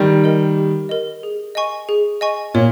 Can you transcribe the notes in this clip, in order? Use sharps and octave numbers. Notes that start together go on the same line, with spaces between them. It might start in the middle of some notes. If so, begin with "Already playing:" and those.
Already playing: D#3 G3
A#4 D#5
G4
A#4 D#5
G#4
D#5 G#5 C#6
G#4
D#5 G#5 C#6
A#2 C#5